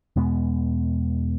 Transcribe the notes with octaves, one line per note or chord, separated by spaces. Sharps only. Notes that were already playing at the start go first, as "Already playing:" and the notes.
E2 B2 G#3 B3